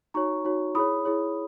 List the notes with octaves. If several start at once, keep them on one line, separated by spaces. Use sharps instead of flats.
D#4 F#4 C#5 A#5 C#6
D#4 F#4 C#5
E4 G#4 C#5 B5 D#6
E4 G#4 C#5